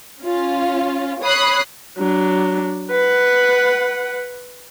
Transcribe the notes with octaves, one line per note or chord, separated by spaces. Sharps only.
C#4 F4
C#5 B5 D#6 F#6 C7
F#3 D4
B4 F#5